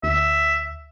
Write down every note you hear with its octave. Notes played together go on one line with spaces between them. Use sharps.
D2 E5